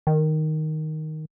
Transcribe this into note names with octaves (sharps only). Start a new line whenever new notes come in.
D#3